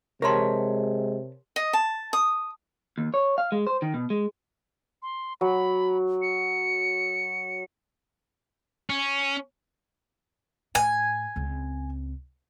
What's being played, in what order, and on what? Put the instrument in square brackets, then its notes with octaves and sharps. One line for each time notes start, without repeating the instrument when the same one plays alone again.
[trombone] C3 [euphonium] G#3 [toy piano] G4 C6 [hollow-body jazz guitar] A#4 C#5 A5
[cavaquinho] D#5
A5
D#6
[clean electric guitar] D#2
C#5
F5
G#3
C5
D#3
B2
G#3
[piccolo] C6
[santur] F#3 [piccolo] B5
[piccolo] C#7
[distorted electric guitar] C#4
[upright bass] A2 [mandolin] G#5
[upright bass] C#2 C4